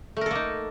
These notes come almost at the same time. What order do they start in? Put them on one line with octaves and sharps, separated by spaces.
A3 A#4 A4 A#3 D#4